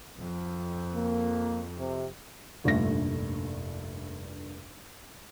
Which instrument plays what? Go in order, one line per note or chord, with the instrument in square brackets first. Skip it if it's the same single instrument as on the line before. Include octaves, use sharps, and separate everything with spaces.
[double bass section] F2
[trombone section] A#3
C3
[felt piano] F1 A#1 G2 A3 A#6